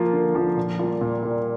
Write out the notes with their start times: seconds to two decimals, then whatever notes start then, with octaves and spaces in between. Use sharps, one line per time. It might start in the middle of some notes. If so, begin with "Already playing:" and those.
Already playing: F3 A#3 F4
0.13 D3
0.35 F3 A#3 F4
0.57 A#2
0.79 G3 A#3 F4
1.01 A#2
1.23 G3 A#3 F4